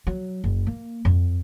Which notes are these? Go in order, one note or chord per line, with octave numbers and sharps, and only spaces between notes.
F#3
F#1
A#3
F2